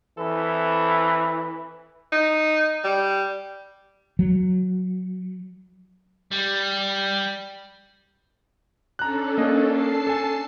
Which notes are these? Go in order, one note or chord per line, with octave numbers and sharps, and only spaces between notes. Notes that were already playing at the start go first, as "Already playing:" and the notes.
E3 C4 A4 B5
D#4
G3
F#3
G3
C#4 D4 A4 A#5 F#6
A#3 D#5
A5 C7
A4 G#5